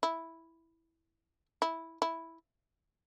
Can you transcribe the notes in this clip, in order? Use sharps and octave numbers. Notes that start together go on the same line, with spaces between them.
E4
E4
E4